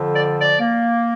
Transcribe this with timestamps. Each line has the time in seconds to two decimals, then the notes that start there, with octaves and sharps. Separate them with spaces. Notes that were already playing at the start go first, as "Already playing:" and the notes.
Already playing: F2 D3 F3
0.14 D5
0.37 D5
0.60 A#3